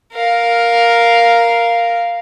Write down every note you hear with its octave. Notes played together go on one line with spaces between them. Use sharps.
A#4 F5